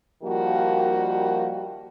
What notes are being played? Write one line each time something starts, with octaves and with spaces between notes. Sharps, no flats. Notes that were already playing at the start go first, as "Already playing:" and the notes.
D#3 F3 G3 A#3 F#4